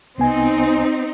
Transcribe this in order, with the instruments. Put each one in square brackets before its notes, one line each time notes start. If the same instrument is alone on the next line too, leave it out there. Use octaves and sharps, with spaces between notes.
[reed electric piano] C2 B3 G#5 [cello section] C4 D#4